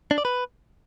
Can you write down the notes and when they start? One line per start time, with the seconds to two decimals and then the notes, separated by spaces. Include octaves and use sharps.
0.11 D4
0.18 D5
0.25 B4